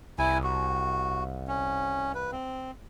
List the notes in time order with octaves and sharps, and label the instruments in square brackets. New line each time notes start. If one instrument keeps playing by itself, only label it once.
[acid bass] C2 [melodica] E4 G#5
[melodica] F#4
C#4
B4
C4